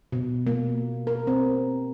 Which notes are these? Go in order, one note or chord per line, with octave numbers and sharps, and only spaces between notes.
B2
A#3
A#4
C4